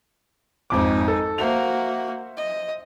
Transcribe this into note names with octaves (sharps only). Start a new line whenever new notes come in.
G#1 F2 G#3 D#4 D6
A4
A#3 F#4 C5 E5 F7
D#5